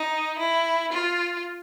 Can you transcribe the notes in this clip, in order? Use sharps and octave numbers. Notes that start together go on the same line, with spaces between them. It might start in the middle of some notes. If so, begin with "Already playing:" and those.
Already playing: D#4
E4
F4